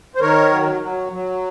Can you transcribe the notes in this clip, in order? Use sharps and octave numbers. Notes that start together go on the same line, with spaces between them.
C5
D#3 A#4 C#5
F#3
F#3
F#3